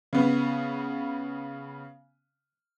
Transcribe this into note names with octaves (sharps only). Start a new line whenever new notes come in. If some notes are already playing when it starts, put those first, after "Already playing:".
C#3 B3